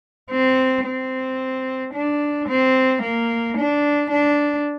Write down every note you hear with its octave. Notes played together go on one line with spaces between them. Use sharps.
C4
C4
D4
C4
A#3
D4
D4